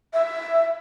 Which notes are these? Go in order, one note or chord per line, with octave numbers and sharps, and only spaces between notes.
E5